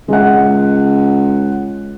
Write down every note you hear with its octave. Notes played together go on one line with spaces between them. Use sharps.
C#2 G#3 F#5